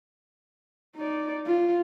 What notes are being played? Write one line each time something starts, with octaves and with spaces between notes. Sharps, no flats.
D#4 D5
F4